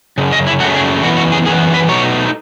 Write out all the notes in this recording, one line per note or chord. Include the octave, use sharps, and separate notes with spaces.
F#2 C#3
D#5
E4
F#2 C#3 F#3 A3 F#4
G#4
F#2 E3 B3 F#4
F#4
G#4
F#2 E3 B3 G#4
B4
B2 F#3 A3 D#4 C#5